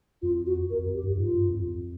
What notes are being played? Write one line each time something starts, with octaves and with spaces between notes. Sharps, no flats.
F2 F4
F#4
F2 A#4
F2
G4
G2
G#2 F4
G2
F2
F2